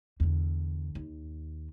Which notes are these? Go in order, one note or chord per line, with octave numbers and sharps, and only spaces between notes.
E2 D3
D#2